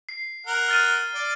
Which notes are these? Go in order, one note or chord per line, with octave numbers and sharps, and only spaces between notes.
C7
A#4 F#5
F6 A6 D#7
D5